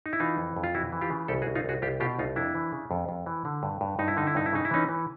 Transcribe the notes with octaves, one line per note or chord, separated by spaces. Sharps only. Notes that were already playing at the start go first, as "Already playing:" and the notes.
D#4
E4
E3 D#4 F4
F2
F2
F4
E3 E4 F#4
E3
F4 G4
C#3
C2 G4 A4
F#4 G#4
C2
D#4 F4
C2 F#4 G#4
C2 F4 G4
B2 F4 G4
C2 D#4 F4
F2 D4 E4
E3
C#3
F2
F2
E3
D3
G2
G2
G2 D#4
E4
D3 D#4
E4
G2 D#4
E4
C#3 D#4
E4
E3 C#4 D#4
E3